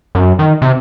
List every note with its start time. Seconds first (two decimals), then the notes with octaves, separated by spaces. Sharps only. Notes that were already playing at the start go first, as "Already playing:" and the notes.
0.15 F#2
0.39 D#3
0.62 C3